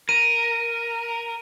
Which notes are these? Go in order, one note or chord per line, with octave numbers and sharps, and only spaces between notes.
A#4 D#7